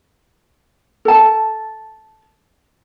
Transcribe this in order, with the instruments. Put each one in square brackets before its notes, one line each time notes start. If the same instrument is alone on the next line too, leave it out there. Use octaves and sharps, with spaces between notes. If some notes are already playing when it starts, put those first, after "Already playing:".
[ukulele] A4 A5